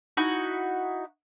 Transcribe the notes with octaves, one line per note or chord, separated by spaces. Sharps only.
D#4 E4 F#4